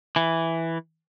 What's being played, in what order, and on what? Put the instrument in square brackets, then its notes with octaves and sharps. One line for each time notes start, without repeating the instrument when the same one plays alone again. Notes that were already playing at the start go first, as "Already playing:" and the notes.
[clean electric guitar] E3